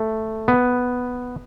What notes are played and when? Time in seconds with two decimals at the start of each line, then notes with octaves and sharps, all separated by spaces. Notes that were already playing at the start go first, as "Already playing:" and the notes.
Already playing: A3
0.48 B3